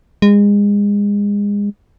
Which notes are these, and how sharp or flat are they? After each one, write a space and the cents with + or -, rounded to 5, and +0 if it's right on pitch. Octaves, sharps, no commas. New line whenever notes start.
G#3 -30